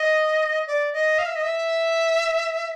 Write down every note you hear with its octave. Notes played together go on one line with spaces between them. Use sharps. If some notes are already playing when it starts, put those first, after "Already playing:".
Already playing: D#5
D5
D#5
F5
E5
D#5
E5